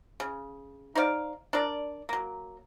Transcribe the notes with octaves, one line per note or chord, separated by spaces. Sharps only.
C#3
D#4 C5 D5 F5
D4 A#4 D5
F#3 A#3